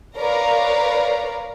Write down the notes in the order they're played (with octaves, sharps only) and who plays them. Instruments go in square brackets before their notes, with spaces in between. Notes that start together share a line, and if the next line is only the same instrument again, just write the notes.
[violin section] A#4 B4 C#5 D5 F5 A#5